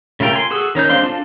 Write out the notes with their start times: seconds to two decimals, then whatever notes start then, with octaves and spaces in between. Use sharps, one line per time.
0.20 C#3 A3 F4 A#4 G5
0.33 G#5 C6
0.50 F#4 G#4 A4 E6
0.75 D#3 C#4 D#4 G6
0.90 G#3 C4 D4 F5 C6
1.04 D4 F4 A4